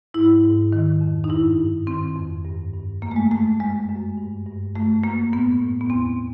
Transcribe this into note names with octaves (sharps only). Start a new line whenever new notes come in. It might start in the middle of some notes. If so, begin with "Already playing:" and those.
G#2 E4
G#2
D#3
F2
D#4
G2 E4
G2
D#3 C4
F2
G2
G2
F#2 A#3
A3
G#3
F#2 A3
F#2 G#3
F#2
G2
G2
F#2 A3
F#2 A#3
A2 B3
A2
B3
E2 C4